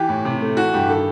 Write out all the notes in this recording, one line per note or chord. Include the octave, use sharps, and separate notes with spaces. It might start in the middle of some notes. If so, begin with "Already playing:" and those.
Already playing: E3 G4
A2
C3
A3
E3 F#4
G2 G4
D#3 A4